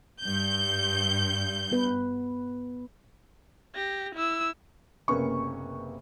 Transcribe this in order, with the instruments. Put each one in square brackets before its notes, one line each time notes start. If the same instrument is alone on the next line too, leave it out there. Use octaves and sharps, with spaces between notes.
[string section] G2 G6
[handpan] B3 B4
[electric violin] G4 A#6
E4 E6
[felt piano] F#1 C3 A#3 B3 C#4 C#6